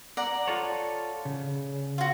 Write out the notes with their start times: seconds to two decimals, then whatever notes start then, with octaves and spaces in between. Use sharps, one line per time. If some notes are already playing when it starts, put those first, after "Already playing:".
0.17 D5 F#5 A#5
0.48 F4 A4 C#5
1.25 C#3
1.98 F4 F#4